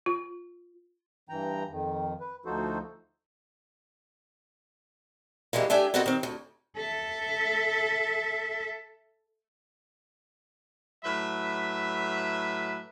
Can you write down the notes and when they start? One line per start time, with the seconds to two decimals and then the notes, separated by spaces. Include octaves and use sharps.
0.06 F4
1.29 G2 E3 G5 A#5
1.69 F2 D#3
2.20 B4
2.45 D2 F3 D#4 F#4 A4 C5
5.53 F#2 E3 G3 G#3 A#3
5.70 A3 D4 G4 E5 G#5
5.94 B3 C4 F#4 A4 A#4 D#5
6.06 D#3 C4
6.23 D2
6.76 A4 E5
11.04 A2 F#3 B4 E5 B5